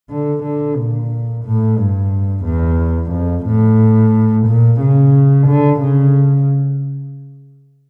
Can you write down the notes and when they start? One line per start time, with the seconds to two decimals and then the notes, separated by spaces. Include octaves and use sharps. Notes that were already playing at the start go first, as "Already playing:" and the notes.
0.10 D3
0.43 D3
0.77 A#2
1.45 A2
1.78 G2
2.45 E2
3.12 F2
3.46 A2
4.46 A#2
4.80 C#3
5.47 D3
5.81 C#3